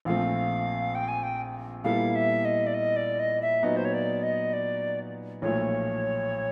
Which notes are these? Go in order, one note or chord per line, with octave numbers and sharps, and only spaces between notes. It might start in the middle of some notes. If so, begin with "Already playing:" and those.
A#1 A#2 F3 A3 C4 F5
G5
G#5
G5
A#2 G3 B3 E4 A4 F5
E5
D#5
D5
D#5
D5
D#5
E5
A#2 F#3 B3 D#4 D#5
C5
C#5
D5
D#5
D5
B1 A#2 F3 A3 C#5